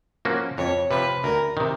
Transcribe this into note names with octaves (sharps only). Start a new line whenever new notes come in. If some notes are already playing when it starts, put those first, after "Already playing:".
F3 A#3 C#4 F#4
F2 C#5
C3 F3 B4
D2 A#4
C3 D#3